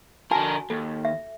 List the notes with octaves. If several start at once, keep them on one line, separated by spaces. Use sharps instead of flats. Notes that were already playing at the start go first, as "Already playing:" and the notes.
D3 F#4 A#4 G#5 A5
D#2 A4
E5